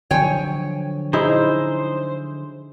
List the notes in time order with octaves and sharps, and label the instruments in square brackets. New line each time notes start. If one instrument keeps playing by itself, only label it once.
[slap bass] D3 F3 F#3 [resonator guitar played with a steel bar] C#5 G5 G#5
[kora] D#4 E4 G#4 [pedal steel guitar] C5